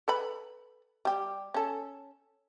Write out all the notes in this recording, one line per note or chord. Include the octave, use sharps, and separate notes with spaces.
A4 B4 B5
G3 G4
C#4 A4